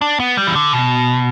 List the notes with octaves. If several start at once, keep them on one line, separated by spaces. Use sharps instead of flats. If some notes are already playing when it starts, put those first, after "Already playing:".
D4
B3
G3
E3
D3
B2